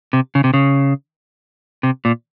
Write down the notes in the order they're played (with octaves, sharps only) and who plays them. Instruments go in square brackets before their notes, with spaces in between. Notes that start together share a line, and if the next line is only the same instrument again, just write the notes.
[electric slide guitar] C3
C#3
C3
C#3
C3
A#2